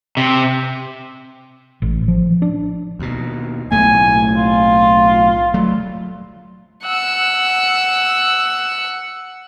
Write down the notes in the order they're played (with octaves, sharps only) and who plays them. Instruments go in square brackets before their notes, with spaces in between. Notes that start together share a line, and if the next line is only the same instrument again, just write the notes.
[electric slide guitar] C3
[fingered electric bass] A1
F3
D4
[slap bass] D#2 B2
[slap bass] B1 A2 A3 [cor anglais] G#5
[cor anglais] F4
[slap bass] F#3 A3
[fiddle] F#5 E6